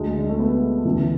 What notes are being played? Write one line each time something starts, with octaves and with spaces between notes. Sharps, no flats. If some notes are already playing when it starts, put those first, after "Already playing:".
Already playing: D2 D3 G#3
G#3
A3
B3
D2 C#3 E3